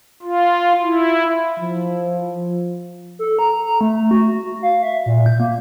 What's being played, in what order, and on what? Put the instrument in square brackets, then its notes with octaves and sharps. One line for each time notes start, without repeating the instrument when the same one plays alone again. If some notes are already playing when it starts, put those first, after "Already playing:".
[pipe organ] F4
E4
[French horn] F3
[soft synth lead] A4
A#5
A#5
A3
F#4
F5
E5
A#2
G6
A#3